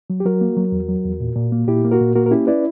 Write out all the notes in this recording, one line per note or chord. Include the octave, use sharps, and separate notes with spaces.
F#3
G4
F#3 F#4 A#4
A#3
F#3
E2
F#3
E2
A#2
A#2
A#3
A#2 E4 G4
A#3
F#4 A#4
A#2
A#3 F#4 A#4
A#4
C#4 E4 G4
E4 B4 D5